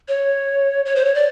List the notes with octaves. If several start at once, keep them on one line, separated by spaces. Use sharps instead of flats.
C#5
C#5
C5
C#5
D5